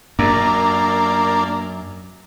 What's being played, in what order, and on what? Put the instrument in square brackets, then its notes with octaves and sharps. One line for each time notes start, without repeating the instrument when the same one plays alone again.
[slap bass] F#2 [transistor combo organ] A#3 D4